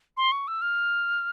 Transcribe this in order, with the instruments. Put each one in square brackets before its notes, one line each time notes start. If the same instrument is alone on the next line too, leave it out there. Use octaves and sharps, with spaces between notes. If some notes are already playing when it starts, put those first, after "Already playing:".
[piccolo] C6
C#6
E6
F6